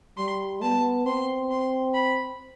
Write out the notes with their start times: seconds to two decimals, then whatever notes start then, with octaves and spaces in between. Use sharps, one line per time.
0.17 G3 C6
0.62 B3 A5
1.06 C4 C6
1.51 C6
1.94 B5